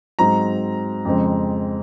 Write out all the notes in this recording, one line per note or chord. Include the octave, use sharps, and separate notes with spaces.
G#2 F#3 C4 A#5
F2 C#3 G#3 C4